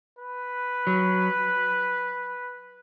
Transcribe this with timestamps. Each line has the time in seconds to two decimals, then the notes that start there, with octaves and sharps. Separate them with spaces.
0.19 B4
0.87 F#3